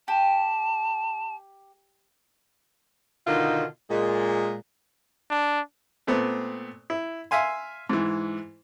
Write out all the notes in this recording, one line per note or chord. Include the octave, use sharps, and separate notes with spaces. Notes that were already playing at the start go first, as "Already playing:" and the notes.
G4 A5
B2 D3 D#3 D#4 F4
A#2 G#3
D4
A#2 A3 B3 C4
E4
E5 F5 G#5 C6
G#2 E3